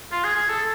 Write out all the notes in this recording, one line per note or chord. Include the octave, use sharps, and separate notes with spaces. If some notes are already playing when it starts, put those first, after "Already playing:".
F4
G#4
G#4
A4